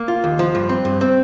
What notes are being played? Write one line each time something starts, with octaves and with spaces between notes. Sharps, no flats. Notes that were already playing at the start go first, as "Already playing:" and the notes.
Already playing: A#3
F4
D#2
F3
G2
C4
G2
C4